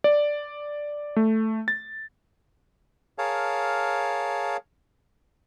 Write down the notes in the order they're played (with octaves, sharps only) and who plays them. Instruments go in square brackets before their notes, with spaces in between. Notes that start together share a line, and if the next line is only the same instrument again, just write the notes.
[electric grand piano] D5
A3
A6
[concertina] G#4 A#4 C#5 F5 A5